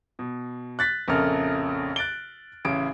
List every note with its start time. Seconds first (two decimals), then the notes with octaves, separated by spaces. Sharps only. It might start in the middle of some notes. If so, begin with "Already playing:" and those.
0.19 B2
0.79 F#6 A6 B6
1.08 A#1 F2 C#3 A4 A#4 F6
1.96 F#6 A6 D7 G7
2.65 A1 C#3 D7